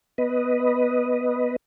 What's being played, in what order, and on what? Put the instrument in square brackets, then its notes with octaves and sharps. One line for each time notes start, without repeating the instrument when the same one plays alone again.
[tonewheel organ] B3 B4 D#5